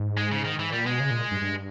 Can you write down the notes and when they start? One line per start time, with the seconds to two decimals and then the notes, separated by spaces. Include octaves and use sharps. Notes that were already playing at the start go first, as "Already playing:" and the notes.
Already playing: G#2
0.17 G#3
0.32 C#3
0.45 D#3
0.59 G#2 E3
0.72 A#2 G3
0.86 B2 G#3
1.00 C#3
1.11 A#2
1.31 G2
1.41 G2